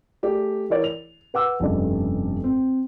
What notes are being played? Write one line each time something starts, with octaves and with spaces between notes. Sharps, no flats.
A3 G4 G#4 D5
E3 E4 A#4 C#5 D5
F7
B4 F#5 D6 E6
F1 G2 C#3 A4 D5 D#5
C4